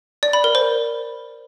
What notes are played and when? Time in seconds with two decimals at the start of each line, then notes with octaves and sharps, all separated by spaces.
0.23 D5
0.33 B5
0.44 A#4
0.55 C5